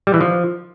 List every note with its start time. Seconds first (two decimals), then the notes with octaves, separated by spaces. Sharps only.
0.07 G3
0.14 E3
0.21 F3